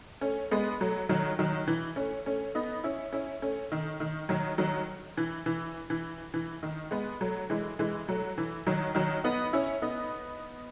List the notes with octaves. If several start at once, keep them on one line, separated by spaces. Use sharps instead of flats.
A3 C#4
G#3 B3
F#3 A3
D#3 F#3
D#3 F#3
E3
A3 C#4
A3 C#4
B3 D#4
C#4 E4
C#4 E4
A3 C#4
D#3
D#3
D#3 F#3
D#3 F#3
E3
E3
E3
E3
D#3
G#3 B3
F#3 A3
E3 G#3
E3 G#3
F#3 A3
E3
D#3 F#3
D#3 F#3
B3 D#4
C#4 E4
B3 D#4